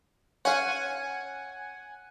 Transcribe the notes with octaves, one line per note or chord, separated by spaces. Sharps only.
C#4 F5 F#5 G#5